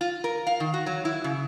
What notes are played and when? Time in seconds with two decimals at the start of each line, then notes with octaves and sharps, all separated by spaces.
0.01 F4
0.24 A#4
0.47 F5
0.60 D#3
0.74 F#4
0.86 F#3
1.05 E4
1.24 C#3